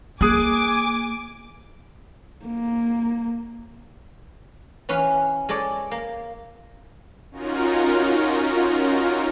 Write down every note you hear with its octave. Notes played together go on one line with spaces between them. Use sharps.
A#3 G#4 G#5 D6 F#6
A#3
E3 C#4 B4 F5
G#3 A4 C#5 D5
A#3
C#4 D#4 F4 F#4 A#4